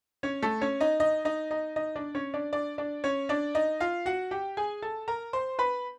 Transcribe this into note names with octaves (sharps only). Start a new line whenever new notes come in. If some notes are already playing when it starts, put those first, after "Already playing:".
C#4 C#5
A3 A4
C#4 C#5
D#4 D#5
D#4 D#5
D#4 D#5
D#4 D#5
D#4 D#5
D4 D5
C#4 C#5
D4 D5
D4 D5
D4 D5
C#4 C#5
D4 D5
D#4 D#5
F4 F5
F#4 F#5
G4 G5
G#4 G#5
A4 A5
A#4 A#5
C5 C6
B4 B5